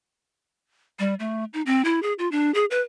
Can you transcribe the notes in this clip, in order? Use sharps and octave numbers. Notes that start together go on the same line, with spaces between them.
G3
A3
D#4
C4
E4
G#4
F4
D4
G#4
B4